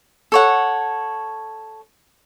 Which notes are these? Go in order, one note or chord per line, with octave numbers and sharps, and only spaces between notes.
A4 C#5 F#5